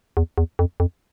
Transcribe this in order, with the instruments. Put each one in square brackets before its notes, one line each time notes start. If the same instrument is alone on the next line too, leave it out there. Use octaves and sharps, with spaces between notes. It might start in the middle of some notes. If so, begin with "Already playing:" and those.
[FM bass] E2
E2
F2
F2